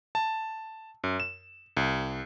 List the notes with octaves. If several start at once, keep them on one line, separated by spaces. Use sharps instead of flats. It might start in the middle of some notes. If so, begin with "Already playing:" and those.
A5
F#2
E7
C2